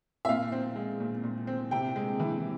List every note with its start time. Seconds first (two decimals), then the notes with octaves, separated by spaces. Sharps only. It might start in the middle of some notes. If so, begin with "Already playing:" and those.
0.25 E5
0.29 A#2 F5
0.52 C4
0.76 G#3
1.00 A#2
1.24 A#2
1.47 C4
1.71 C3 G5
1.96 G#3
2.20 E3